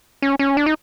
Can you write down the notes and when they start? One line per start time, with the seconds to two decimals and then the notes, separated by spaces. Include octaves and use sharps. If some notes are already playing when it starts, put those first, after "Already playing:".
0.22 C#4
0.39 C#4
0.57 D4
0.66 D#4